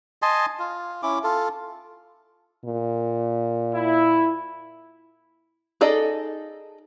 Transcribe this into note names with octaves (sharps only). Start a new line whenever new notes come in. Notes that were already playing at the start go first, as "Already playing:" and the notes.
D#5 G#5 A5 C6
F4
C#4 E4 D6
F4 A4
A#2
E4
D#4 G#4 A4 D5 D#5